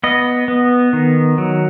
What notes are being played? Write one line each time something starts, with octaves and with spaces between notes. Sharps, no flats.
B3 D#5
B3
D#3
F#3